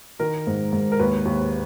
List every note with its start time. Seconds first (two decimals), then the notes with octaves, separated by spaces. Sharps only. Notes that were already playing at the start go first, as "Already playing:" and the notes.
0.20 D#3 A#4
0.47 G#2
0.73 G#2
0.92 A#4
0.99 D#2 B4
1.25 D#2